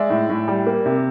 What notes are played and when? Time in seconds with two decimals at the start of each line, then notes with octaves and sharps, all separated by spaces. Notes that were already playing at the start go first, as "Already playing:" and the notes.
Already playing: G#3 D5 E5
0.10 A2
0.29 A2
0.48 G3
0.67 A#3
0.86 C3